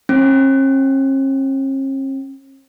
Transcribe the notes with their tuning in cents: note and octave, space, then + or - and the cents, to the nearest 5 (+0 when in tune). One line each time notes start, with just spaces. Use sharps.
C#4 -45